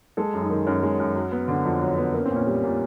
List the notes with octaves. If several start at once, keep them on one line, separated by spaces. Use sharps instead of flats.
G#3 A4
F#2
D#4
D#3
F#2 C#4
G#3
F#2
F#3
B3
D3
F2
F#3
B3
A#3 C#4
A#2 C4
C#4
G3
A#2